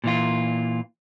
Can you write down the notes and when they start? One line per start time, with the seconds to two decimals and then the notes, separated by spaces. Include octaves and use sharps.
0.04 A#2 E3 F4